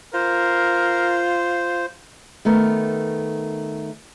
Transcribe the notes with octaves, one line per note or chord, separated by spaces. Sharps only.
F4 A#4 C5
D#3 A3 B3 A#4